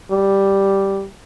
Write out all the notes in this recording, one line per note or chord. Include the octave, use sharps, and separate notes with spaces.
G3